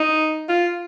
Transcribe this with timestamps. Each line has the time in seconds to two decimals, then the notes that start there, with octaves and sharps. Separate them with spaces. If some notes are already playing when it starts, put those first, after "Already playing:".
Already playing: D#4
0.49 F4